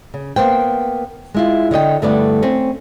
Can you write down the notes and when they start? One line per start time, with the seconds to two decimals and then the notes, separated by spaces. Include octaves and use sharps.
0.14 C#3
0.36 A#3 B3 C5 G5
1.35 G#3 E4 F4
1.71 D3 C#5 D#5 G5
2.02 G2 D3 A3 B3 E4 D5
2.43 C4 C#4